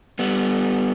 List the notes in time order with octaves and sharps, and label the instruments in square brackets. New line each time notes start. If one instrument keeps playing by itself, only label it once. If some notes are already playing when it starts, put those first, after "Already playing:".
[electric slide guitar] G3 B3